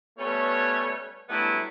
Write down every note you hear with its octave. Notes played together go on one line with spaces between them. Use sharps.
G3 A3 B3 C#4 C#5
F#3 G3 A3 B3 D4 E4